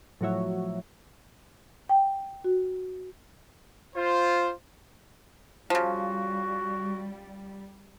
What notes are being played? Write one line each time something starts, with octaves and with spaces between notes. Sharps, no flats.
A2 F3 F#3 F#4 C#5 E5
G5
F#4
F4 C5
C#3 F3 G3 F#4